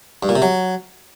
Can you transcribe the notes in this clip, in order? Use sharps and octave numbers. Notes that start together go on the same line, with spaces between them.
G2
A#2
C3
F#3